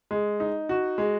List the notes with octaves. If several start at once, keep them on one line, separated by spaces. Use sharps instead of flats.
G#3
D#4
F#4
G#3